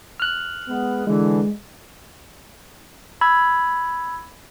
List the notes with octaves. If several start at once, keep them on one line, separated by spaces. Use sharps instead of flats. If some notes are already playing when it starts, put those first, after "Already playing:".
F6 F#6
G#3 B3
D3 E3 G#3
B5 E6 G#6